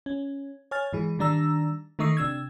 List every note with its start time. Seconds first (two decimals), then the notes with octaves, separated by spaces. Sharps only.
0.06 C#4
0.71 C#5 G#5 F6 A6
0.93 G#2 E3 G#4
1.19 D#3 G3 D4 A#5 E6
1.99 D#3 A3 D#4 C#6 D#6 C7
2.17 C3 D4 E6 G#6